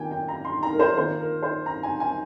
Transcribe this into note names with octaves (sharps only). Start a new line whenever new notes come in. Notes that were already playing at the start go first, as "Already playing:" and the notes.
Already playing: D#3 A#3 F4 G5 G#5
G5
A#5
C6
A#5
A#4
C5
D#3 A#3 F4 C5
A#4
C5
A#5
G#5
G#5